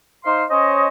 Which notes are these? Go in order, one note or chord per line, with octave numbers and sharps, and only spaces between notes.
D#4 C5 F5 C6
C#4 C5 C#5 D#5